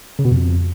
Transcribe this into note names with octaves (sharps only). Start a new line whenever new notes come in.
C#3
B2
F2